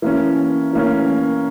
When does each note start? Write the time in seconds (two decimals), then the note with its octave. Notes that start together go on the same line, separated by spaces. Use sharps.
0.02 E3 A#3 C#4
0.73 E3 A#3 C#4